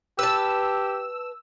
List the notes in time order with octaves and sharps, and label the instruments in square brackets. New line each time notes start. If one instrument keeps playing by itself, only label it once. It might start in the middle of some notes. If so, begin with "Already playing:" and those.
[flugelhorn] G4 [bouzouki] B4 A5 [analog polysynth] E6